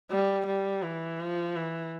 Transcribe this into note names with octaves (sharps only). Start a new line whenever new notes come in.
G3
G3
E3
F3
E3